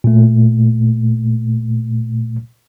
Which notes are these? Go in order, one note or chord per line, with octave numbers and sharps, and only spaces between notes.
A#2 A3